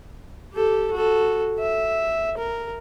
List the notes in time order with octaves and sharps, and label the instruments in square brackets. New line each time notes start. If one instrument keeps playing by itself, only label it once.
[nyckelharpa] G4 A4
F#4 A4
E5
A#4